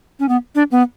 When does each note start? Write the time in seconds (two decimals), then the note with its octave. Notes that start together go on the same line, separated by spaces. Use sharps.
0.20 C#4
0.29 B3
0.55 D4
0.71 B3